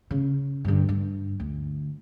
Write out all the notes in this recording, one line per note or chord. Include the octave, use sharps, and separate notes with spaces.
C#3
G2 D3
G2
D2